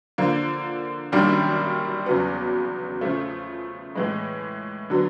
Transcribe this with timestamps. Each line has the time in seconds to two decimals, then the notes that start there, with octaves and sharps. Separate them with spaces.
0.18 D3 F3 A#3
1.12 F#2 D#3 G3 A#3 D4
2.06 E2 C#3 F#3 B3
3.01 C#3 F3 A3
3.95 A2 E3 G#3
4.90 D3 F#3 B3